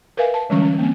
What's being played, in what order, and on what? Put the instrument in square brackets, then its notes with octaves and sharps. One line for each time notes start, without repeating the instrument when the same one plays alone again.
[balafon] A#4 B4 E5 F5 G#5
A5
D3 E3 G3 G#3 C#4 C#6
C#4
A#3 C4